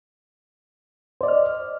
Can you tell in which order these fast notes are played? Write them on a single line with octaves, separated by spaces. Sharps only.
C5 D5 D#5 F6